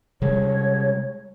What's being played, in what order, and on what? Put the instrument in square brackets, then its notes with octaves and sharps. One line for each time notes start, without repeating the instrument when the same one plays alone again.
[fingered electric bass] C3 G3 G#3 [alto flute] C#5